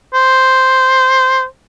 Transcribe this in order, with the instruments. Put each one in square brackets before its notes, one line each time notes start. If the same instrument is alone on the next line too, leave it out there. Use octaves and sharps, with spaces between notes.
[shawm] C5